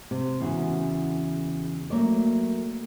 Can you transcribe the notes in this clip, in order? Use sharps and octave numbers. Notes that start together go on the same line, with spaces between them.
C3
E2 C#3 F#4
F#3 A3 A#3 C#5 D5